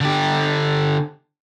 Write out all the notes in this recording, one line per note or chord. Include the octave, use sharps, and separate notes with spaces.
D3 G4